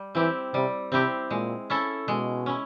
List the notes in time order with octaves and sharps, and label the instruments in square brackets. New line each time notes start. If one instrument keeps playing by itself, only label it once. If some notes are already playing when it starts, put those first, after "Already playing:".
Already playing: [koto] G3
[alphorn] E3 [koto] C4 E4 G4
[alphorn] C3 [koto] G3
[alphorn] C3 [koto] C4 E4 G4
[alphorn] A#2 [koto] G#3
[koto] C#4 E4 A4
[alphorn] B2 [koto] G#3
[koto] C#4 E4